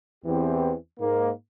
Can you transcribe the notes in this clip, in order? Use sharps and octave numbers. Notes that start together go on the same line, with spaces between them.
E2 E3 C4 G4
G#2 A#3